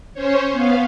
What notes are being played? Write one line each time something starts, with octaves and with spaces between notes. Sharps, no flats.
C#4 C5 C#5
B3 F5